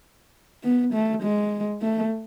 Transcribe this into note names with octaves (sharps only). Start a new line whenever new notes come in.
B3
A3
G#3
A3